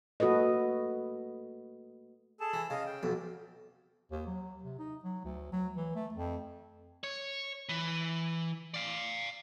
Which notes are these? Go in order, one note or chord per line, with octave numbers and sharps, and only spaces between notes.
A3 A#3 F#4 A4 B4 D#5
G#4 A4 A5
E3
C#3 D#5 F5
G5
B1 F2
D#2
F#3
C3
D#4
F#3
D2
F#3
E3
A3
F2
C#5
E3
D5 F5